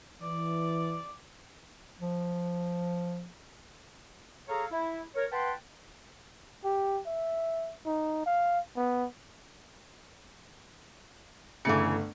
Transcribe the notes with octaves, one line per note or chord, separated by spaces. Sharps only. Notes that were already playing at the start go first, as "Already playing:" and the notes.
E3 D5
F3
G#4 A4 C#5 F5 A#5
E4
A#4 C#5
B4 F#5 G5 A5 C6
G4
E5
D#4
F5
B3
G1 C#3 E3 A3 C#7